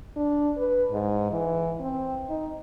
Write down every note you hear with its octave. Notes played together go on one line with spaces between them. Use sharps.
D4
B4
G#2
E3
C4
D#4